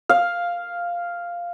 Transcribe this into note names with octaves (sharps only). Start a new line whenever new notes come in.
F5